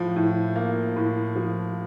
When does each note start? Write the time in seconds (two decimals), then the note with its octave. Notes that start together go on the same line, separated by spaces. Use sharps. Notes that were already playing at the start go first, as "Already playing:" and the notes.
Already playing: A2 F3
0.16 A2
0.56 A#3
0.96 A2
1.36 F3